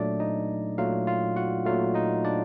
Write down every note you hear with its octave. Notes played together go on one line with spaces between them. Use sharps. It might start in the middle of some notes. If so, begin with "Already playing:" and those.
Already playing: A#2 F#3 A3 D4 D5
D#4 D#5
A#2 F#3 A3 F4 F5
F4 F5
F#4 F#5
A#2 F#3 A3 F4 F5
D#4 D#5
D4 D5